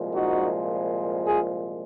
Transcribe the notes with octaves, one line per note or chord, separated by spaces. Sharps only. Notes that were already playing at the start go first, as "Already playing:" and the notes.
Already playing: C2 A#2 F3 G#3
D#4 F#4
F4 G#4